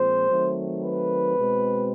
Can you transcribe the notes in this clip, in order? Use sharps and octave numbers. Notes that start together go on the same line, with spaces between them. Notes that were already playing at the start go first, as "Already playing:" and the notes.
Already playing: A#2 F3 G#3 C4 C5
D#3 F#3 A3 C4
B4
B2 G#3 C4